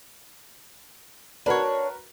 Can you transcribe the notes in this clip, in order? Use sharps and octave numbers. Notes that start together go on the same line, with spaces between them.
D4 F#4 A#4 B4 C#5